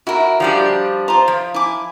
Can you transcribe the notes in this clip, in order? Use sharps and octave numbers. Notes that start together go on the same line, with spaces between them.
E4 F#4 A#4
F3 G3 D4
F4 C5 A#5
F3
E4 G#5 D6